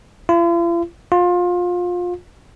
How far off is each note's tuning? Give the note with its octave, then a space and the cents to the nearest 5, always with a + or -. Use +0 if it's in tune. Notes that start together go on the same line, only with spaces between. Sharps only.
F4 -45
F4 +25